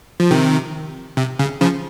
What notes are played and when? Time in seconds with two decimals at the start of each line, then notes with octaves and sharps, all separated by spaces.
0.20 F3
0.31 C3 D#3
1.17 C3
1.39 C#3
1.61 C#3 F3